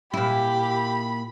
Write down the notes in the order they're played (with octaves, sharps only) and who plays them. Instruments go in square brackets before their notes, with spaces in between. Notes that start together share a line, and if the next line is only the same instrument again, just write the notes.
[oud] A#2 E4 [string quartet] G4 [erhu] B5